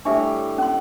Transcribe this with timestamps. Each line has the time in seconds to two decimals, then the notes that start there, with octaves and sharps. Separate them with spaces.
0.05 A2 G3 D4 C#5 E5
0.58 C#4 C6